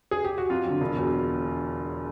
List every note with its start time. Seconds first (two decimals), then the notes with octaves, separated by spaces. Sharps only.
0.11 G#4
0.25 G4
0.38 F#4
0.50 F2 F4
0.65 D3 F#3
0.81 E1
0.96 E2 B2 F#3